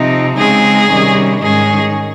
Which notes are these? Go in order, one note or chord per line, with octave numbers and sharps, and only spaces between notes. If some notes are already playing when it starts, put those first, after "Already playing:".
Already playing: C3 F3 C4 D#4
C#3 G#3 C4 D#4 G#4
C3 D#3 G3 C#4
G#2 D#3 G#3 C#4 G#4